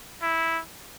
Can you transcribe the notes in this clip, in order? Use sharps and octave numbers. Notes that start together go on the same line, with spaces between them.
E4